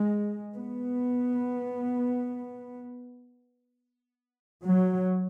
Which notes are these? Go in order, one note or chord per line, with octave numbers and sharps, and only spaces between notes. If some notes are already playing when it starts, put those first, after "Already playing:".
Already playing: G#3
B3
F#3